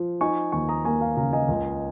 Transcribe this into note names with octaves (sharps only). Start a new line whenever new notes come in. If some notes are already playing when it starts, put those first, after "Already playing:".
Already playing: F3
D#4 G#5 C#6
D#2 G#5 C#6
A#5 D#6
A#3 G#5 C#6
F5 A#5
C#3 F5 A#5
D#5 G#5
C#2